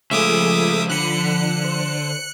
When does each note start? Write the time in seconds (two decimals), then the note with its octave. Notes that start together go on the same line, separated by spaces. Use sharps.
0.11 C#3 F3 G#3 A3 G#4 E5 D6 D#6
0.90 D3 B5 F#6 C#7
1.65 C5